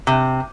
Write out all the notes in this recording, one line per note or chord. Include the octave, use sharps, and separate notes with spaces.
C3